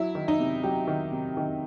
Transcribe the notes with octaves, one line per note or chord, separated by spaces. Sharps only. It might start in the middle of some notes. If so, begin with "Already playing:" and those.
Already playing: F#3 E4
D#3
D#4
C3
F#3 G4
D#3
C3
D#3